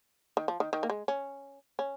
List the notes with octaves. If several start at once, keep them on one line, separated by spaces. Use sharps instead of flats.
D#3
F3
D#3
D#3
A#3
G#3
C#4
C#4